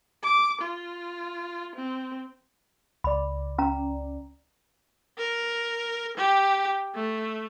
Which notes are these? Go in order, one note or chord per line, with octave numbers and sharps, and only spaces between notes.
D6
F4
C4
C#2 D5 B5
C#4 A#5
A#4
G4
A3